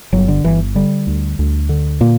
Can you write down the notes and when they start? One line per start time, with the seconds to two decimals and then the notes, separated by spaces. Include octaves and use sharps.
0.12 G1 F#3
0.28 D3
0.44 G1 E3
0.75 D3 G3
1.07 D2
1.39 D2
1.69 D3
2.01 A#2 A#3